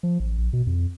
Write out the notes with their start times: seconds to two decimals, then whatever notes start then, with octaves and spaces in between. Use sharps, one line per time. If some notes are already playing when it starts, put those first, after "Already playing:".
0.03 F3
0.20 A1
0.38 A#1
0.53 B2
0.67 F2